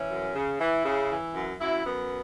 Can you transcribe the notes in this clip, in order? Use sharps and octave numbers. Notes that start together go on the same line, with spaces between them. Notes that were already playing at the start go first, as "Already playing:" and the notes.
Already playing: E3 C#4
F#2
C#3
E3 E4
C#3
E3
F#2
F#2 E4
F#2 B3